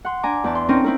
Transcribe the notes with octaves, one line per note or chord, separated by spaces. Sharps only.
F#5 C6
D4 G#5 A#5 D6
E2 D5 A5
C6
C4 C#4 D#4 A#4
C4 E4 A#4